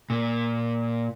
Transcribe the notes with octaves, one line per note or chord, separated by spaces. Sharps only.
A#2